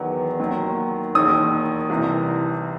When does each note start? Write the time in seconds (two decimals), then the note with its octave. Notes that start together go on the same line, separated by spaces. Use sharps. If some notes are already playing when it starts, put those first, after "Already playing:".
Already playing: E2 D#3 F#3 B3
0.40 D#2 D#3 F#3
1.15 E1 D#2 D#3 D#6
1.90 C2 C3 E3